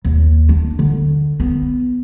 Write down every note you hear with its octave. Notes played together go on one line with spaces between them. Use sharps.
D#2
D4
D3
B3